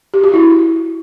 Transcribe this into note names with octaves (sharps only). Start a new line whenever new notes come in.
G4
F#4
E4